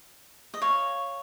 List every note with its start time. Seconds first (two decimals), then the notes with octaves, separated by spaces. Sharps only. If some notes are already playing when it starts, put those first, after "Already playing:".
0.54 D#5
0.62 C#5 F5